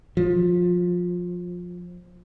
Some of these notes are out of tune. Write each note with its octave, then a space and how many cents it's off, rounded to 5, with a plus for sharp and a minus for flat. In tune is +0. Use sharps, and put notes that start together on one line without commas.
F3 +20